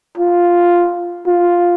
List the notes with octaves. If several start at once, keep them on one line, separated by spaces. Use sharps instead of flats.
F4
F4